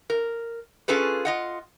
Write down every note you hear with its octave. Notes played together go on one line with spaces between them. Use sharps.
A#4
C#4 F4 G#4 A4 B4
F4 D#5 F#5